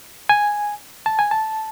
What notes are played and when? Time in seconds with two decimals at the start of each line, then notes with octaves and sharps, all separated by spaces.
0.29 G#5
1.06 A5
1.19 G#5
1.31 A5